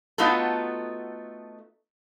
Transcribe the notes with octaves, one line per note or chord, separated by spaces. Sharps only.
A3 B3 D#4 F4 F#4 A4